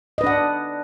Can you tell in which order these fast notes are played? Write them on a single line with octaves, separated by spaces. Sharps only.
D#5 B4 D4 F#5